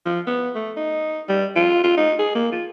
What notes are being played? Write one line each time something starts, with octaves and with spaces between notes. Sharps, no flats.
F3
B3
A3
D#4
G3
F4
F4
D#4
G#4
A#3
F4